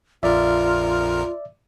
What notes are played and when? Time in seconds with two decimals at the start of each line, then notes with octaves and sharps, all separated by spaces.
0.23 A#1 F2 F4 A#4 D5 E5